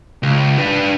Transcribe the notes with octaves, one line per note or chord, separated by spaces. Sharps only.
C#2
D4 B4